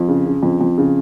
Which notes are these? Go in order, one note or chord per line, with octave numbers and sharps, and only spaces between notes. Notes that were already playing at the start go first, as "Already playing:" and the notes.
Already playing: F2
C#3
C#3
F2
F2
C#3